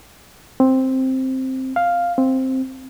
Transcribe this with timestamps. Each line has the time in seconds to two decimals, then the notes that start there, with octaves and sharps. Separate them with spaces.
0.60 C4
1.76 F5
2.18 C4